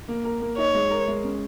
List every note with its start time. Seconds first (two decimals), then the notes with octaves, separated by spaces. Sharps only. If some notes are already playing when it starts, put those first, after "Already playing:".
0.08 A#3
0.25 A#4
0.42 A#3
0.58 D#4 C#5
0.75 G#3
0.91 A#4
1.08 G#3
1.24 C#4